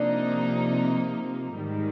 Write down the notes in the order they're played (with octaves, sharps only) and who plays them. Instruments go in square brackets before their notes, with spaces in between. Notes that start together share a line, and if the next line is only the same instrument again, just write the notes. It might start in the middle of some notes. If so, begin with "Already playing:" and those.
Already playing: [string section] C3 F3 A#3 D#4 [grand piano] D4
[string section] G#2 D#3 G3